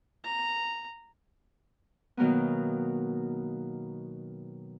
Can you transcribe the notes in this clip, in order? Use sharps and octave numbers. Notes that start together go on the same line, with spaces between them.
A#5
B2 D#3 F#3 A#3 B3